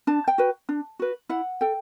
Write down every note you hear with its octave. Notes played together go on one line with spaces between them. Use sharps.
D4 A5
G5
F#4 B4
D4
F#4 B4
E4 F#5
A4 G5